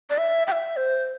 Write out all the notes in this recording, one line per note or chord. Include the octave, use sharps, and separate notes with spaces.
D5
E5
G5
E5
C5